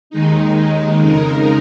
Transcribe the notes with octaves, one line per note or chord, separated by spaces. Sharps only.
D#2 D#3 G#3 D#4
F2 C#3 G#3 D#4 A#4